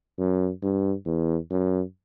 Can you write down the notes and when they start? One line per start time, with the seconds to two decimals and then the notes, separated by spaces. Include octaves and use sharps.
0.19 F#2
0.62 G2
1.06 E2
1.51 F#2